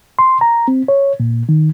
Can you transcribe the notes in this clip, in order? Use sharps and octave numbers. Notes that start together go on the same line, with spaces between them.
C6
A#5
C4
C#5
A#2
D#3